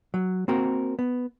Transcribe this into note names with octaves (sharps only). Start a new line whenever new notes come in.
F#3
A#3 C4 F#4 A#4
B3